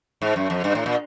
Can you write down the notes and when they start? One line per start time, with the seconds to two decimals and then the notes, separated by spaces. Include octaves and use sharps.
0.22 G#2
0.36 F#2
0.50 F2
0.64 G2
0.75 A2
0.86 A#2